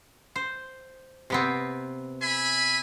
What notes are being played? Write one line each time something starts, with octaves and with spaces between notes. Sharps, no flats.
C5
C3 B3 C4
E5 G#5 B5